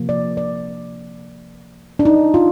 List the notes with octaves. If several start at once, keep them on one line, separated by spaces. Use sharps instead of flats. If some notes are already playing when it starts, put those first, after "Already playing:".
Already playing: C3 F3 A#3
D5
D5
D4
D#4
F4